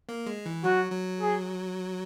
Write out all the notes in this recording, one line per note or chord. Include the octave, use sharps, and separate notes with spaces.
A#3
G#3
E3
F#3 F#4
F#3
G#4